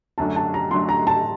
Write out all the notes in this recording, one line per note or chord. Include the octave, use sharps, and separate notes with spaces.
F#2 D3 F#3 A3 D4 A5
A5
A#5
F#2 D3 F#3 A3 D4 C6
A#5
A5